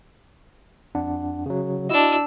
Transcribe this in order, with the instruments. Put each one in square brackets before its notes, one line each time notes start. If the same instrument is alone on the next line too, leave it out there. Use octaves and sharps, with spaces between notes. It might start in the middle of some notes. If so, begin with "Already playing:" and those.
[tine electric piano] F2 D4 F#5
C#3 F#3
[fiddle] D4 E6 [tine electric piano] E4 F#4 D#5